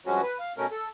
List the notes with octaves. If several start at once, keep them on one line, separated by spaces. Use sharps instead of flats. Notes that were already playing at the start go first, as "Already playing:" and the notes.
G2 F3 F#3 G#3 C#4 F#4
B4
F5
B2 A3 C#4 A#4
A4